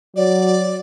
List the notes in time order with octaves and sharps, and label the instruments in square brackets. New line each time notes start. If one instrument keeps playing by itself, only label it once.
[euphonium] F#3 [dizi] D5